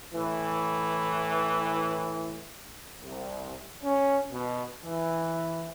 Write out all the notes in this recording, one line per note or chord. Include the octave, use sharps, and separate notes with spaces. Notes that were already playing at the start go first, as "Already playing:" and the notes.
A2 E3
C2
C#4
B2
E3